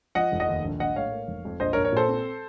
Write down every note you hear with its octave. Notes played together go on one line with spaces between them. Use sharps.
F3 D#5 F#5
F1
D#5 F#5
D#2
A#1
A#1 D#5 F#5
A2 C#5 F5
A#3
F1
F2
A#1 C5 D#5
A#4 C#5
A#1
A#4 C#5
A#2 A4 C5
C4